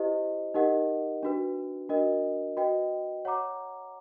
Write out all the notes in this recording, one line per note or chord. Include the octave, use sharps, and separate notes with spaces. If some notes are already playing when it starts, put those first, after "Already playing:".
Already playing: E4 G4 C5 D#5
D#4 G4 A#4 D#5 F#5
D4 F#4 B4
D4 F#4 A#4 D#5
F#4 B4 D#5 G5
C#5 F#5 A#5 D6